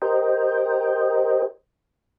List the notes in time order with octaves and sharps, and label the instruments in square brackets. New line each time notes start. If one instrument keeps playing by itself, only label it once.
[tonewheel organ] G4 A#4 C5 D#5 G5